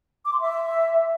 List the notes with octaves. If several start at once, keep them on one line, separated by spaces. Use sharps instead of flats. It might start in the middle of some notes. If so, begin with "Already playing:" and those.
D6
C6
E5